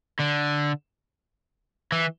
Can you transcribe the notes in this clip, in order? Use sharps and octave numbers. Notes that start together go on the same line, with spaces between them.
D3
E3